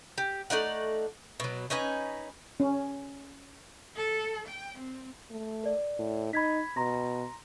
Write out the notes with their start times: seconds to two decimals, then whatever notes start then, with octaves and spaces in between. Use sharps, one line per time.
0.18 G4
0.50 A3 D#4 D5 F#5
1.40 B2 F#3
1.70 C#4 D#4 B4 G#5
2.60 C#4
3.96 A4
4.48 G5
4.78 C4
5.31 A3
5.63 A#4 D5
5.99 A2
6.33 D#4 B5 G#6 B6
6.76 B2 A#5 C6 A#6